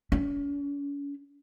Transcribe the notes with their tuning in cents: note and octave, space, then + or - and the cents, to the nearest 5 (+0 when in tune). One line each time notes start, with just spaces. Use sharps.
C#4 +40